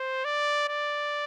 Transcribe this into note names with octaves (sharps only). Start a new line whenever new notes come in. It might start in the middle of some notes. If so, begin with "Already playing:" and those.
Already playing: C5
D5
D5